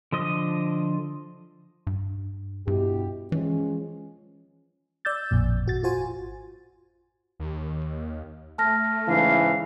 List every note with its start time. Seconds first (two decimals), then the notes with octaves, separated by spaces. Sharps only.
0.12 D3 F3 D#5 D#6
1.87 G2
2.67 G2 B2 E4 G4
3.32 E3 F3 G#3 C#4
5.05 D5 E6 G6 A6
5.31 A1 F2 A#2
5.66 G#1 F#4 A6
5.83 F4 F#4 C5 G#5
7.40 D#2
8.58 A3 A5 F6 A#6
9.07 G#2 C#3 E3 F5